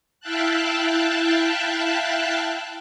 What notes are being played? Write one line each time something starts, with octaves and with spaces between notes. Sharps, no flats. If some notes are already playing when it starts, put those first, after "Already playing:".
E4 E5 F5 G5 A5 F#6